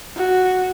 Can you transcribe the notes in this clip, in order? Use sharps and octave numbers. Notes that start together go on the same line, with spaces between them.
F#4